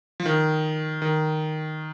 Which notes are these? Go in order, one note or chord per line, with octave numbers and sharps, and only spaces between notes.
F3
D#3
D#3